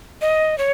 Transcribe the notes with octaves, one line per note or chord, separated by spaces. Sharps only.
D#5
C#5